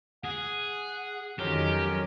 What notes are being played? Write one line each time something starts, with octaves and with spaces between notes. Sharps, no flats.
G#4 F#5
F2 D#3 F#3 G#3 C#4 G4 A#4